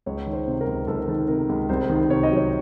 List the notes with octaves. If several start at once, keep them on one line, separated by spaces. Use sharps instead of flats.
C#2 C#5
D#3
C5
C3
A#4
C#2
C#2 A4
A#4
D#3 A4
C3 A#4
C#2
C2 C5
D#3
C3 C#5
D#5
F#3
C#5